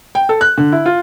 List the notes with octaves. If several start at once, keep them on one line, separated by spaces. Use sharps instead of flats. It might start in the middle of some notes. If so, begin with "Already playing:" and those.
G5
A4
F#6
D3
E4
F4